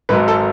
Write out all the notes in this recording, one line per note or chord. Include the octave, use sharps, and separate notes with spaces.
G#1 G#2 F#3 B4
A4